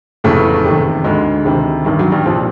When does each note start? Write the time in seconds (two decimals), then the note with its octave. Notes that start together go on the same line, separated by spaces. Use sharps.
0.24 F1 E2 A2 C#3 E3 A3
0.65 F#1 E2 C3 D#3
1.04 D2 G#2 D3 G#3
1.45 D2 C3 D#3
1.85 A1 G2 D#3
1.99 F#3
2.12 G2 G3
2.26 C2 A#2 F3